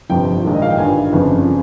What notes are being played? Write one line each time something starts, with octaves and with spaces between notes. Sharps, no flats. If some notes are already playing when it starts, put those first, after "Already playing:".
G1 F2 C3 F3 G5
A#1 G#2 D#3
D#5
F5
G5
G1 G2 D#3 G#5
G1 F2 C#3 F3